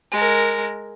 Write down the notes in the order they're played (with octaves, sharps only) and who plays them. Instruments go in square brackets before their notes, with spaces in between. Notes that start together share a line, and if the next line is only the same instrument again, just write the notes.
[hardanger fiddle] G#3 A#4